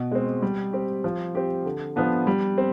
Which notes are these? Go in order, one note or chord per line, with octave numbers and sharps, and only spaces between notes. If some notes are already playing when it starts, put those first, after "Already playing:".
Already playing: B2
G#3 C4
G3
C4 G4
F3
C4 G4
D3
F3 B3 D4
G3
C4